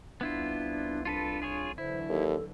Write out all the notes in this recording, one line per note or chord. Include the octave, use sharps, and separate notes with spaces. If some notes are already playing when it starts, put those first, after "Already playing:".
C2 B3 D4 E4 F4
D4 F4 A4 B4
F4 G#4 C#5
D3 E3 F#3 E4 C5
D#2 A4